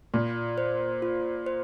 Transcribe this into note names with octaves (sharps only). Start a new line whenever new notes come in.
A#2 F4
C5
F4
C5